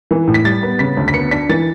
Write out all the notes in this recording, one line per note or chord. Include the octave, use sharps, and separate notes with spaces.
E3
A2
B6
G3 A6
B3
C#3 B6
D2
B6
B3 C#7
D4 B6
E3 A6